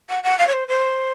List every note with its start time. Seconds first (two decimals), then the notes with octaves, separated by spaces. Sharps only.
0.09 F#5
0.23 F#5
0.38 F5
0.47 C#5
0.53 C5
0.68 C5